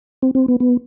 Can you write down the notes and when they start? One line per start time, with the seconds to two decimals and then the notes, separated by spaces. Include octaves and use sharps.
0.22 C4
0.35 C4
0.48 B3
0.60 B3